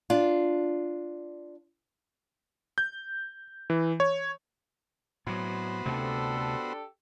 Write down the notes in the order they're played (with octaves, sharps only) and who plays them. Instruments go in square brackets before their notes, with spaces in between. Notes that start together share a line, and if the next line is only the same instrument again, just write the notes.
[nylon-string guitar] D4 F4
[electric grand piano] G6
E3
C#5
[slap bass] A2 F#3 [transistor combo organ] B3 F#4 C5
[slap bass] D2 C3 A3 [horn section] D4 G4 A4